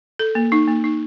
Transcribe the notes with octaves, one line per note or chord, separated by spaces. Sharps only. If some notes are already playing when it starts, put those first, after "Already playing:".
A4
A#3
D#4
A#3
D#4